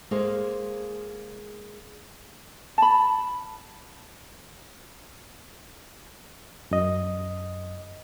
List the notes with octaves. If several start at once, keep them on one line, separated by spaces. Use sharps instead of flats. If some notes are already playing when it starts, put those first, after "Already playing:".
G#3 A#3 G#4 A4 C5 F5
A5 B5
F#2 D#5